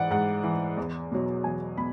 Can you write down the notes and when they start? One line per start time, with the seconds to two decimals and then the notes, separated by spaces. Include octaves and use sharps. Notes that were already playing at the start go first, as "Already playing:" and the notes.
Already playing: G#2 E3 D5 F#5
0.11 G#2 F#5
0.44 E3
0.77 E2
1.12 B2 F#3
1.44 E2 G#5
1.78 B2 B5